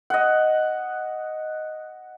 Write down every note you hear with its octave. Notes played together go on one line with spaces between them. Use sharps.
D#5 F#5